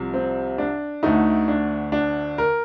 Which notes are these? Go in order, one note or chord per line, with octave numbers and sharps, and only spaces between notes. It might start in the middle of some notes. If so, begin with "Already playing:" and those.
Already playing: C2 C3 F3
C4
D4
D2 D3 A3 D#4
D4
D4
A#4